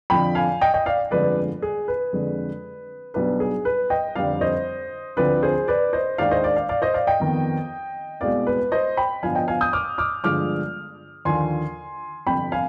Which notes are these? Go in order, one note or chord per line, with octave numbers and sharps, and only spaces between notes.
F2 D3 F3 G5 B5
F5 G#5
D#5 G5
D#5 G5
D5 F5
G1 F2 D3 F3 G#3 B4 D5
G#4
B4
F2 D3 G#3
B1 B2 G3 D4 B4
G#4
B4
D#5 G5
F1 F2 D3 G3 C4 D5 F5
C5 D#5
D2 D3 F3 C4 B4 D5
G#4 C5
B4 D5
C5 D#5
D#2 D#3 G#3 D4 D5 F5
C5 D#5
D5 F5
D5 F5
D5 F5
C5 D#5
D5 F5
D#5 G5
F2 D#3 B3
C2 B2 G#3 D5 F5
B4
C5 D#5
G5 B5
G1 G2 F3 B3 D4 F5 G#5
D#5 G5
F5 G#5
D#6 G6
D6 F6
D6 F6
G1 G2 D3 F3 G#3 D6 F6
D#2 D3 F3 G#5 C6
G1 F2 C3 G5 B5
F5 G#5